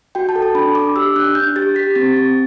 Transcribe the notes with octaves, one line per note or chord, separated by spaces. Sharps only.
F#4 G5
A5
A4
A5
D4 B5
D4 D6
G4 E6
D4 F#6
D4 G6
G4 A6
G4 B6
C4 A6
C4